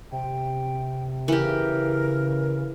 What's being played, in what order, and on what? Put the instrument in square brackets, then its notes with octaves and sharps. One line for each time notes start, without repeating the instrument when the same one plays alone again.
[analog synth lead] C3 [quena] G5
[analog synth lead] C#3 [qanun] E3 G4 [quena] A#4